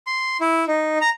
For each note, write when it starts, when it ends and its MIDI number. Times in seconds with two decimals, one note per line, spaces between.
0.07 0.37 84
0.41 0.65 64
0.68 0.98 63
1.01 1.10 82